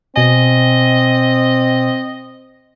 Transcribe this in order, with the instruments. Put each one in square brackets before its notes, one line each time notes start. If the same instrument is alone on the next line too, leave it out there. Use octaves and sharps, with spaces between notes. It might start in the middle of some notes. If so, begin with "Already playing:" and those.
[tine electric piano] B2 G#5 [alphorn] C4 [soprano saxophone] D#5